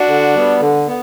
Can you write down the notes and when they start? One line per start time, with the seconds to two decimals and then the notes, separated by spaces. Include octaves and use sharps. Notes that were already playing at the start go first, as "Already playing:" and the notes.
Already playing: D4 F#4
0.08 D3
0.35 G3 B3
0.61 D3
0.87 B3